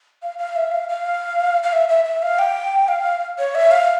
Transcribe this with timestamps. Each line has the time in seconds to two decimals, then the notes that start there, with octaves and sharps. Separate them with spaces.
0.23 F5
0.38 F5
0.56 E5
0.71 F5
0.89 F5
1.63 F5
1.73 E5
1.89 E5
2.05 E5
2.22 F5
2.39 G5
2.88 F5
3.38 C#5
3.55 E5
3.71 F5